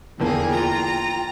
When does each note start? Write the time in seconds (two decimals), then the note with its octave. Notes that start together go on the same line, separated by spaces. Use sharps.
0.20 E2 D3 F3 A#3 G#4 G5
0.52 F4 A#5